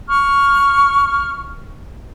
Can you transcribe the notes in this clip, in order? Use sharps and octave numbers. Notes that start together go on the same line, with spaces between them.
C#6 F6